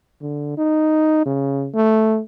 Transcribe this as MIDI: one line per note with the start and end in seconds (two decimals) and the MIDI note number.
0.21 0.54 50
0.58 1.23 63
1.26 1.69 49
1.74 2.21 57